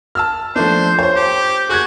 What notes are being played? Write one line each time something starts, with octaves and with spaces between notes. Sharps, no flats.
A5 E6 F6
F3 A3 D4 C5
C5 C#5
G4
F#4 G#4 F#6 G#6